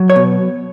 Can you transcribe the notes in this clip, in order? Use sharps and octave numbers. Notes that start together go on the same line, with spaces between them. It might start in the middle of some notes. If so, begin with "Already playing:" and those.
Already playing: F#3
C#5
B2